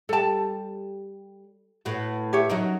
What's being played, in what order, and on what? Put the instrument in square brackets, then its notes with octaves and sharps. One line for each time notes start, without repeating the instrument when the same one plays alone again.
[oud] G3 G4 [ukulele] A4 A5
[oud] A2 B3 F#4
[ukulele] G4 C#5 E5
[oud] F#3 C#4 A#4 [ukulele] D#4